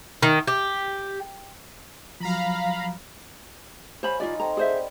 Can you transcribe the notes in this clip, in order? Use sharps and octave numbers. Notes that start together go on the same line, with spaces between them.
D#3
G4
F3 F#3 F5 A#5 B5
C5 C#5 F5 G#5 B5
D#4 F4 F#4 D5 B5
C4 A4 A#5
G#4 C5 D5 E5 F#5
B5